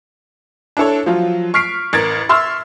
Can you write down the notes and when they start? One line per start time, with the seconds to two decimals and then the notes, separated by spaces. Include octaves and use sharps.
0.77 D4 E4 A4 C#5
1.06 F3 F#3 F4
1.54 C#6 F6 B6 C7 D7
1.93 A1 A#4 G#6 A6 D7
2.29 E5 C6 C#6 E6 F6